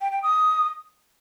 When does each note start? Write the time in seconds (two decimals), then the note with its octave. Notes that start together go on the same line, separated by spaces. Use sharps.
0.01 G5
0.12 G5
0.23 D#6